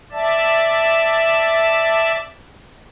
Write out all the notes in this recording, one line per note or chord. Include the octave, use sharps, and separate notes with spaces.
D5 E5 A5